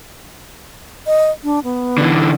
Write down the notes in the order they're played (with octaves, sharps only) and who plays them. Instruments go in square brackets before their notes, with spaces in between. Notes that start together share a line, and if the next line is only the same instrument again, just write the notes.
[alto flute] D#5
D4
B3
[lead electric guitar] D3 E3